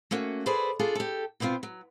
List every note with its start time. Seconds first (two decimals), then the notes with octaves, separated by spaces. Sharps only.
0.11 A3 A#3 C#4 F#4
0.46 G#4 A4 B4 C5 D5
0.79 D4 F4 G#4 A4
0.95 G4 A4
1.40 B2 B3 C4 D#4 F4
1.63 F#3